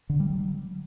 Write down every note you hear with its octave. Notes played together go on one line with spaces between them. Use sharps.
D3
G3
F#3